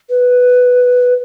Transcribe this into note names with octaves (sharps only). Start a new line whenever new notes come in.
B4